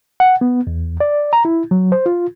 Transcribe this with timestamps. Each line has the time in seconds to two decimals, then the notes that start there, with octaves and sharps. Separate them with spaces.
0.20 F#5
0.41 B3
0.67 E2
1.00 D5
1.33 A#5
1.45 E4
1.71 F#3
1.92 C5
2.06 F4